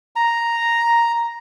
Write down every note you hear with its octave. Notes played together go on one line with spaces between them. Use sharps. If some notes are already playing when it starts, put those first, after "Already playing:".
A#5